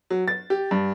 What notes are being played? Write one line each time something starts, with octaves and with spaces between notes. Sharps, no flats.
F#3
A6
G4
G2